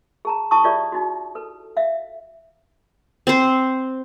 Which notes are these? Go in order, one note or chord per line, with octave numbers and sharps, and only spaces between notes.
G#4 A5 A#5
E4 A5 C#6 D#6
F4 G4 G#4 C#5 D5 E5
D#4 E4 F#4
A4 B4
E5 F5
C4 C5